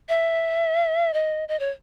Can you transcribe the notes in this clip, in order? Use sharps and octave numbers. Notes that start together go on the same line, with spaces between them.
E5
D#5
D#5
C#5